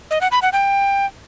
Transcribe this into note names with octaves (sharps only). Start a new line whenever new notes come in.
D#5
F#5
B5
F#5
G5